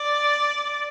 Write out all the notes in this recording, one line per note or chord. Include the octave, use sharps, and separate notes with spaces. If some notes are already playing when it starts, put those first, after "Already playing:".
Already playing: D5